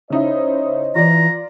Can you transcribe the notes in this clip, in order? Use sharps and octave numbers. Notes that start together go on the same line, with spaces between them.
C#3 D#4 E4 C5 C#5 D#5
E3 F4 D5 A#5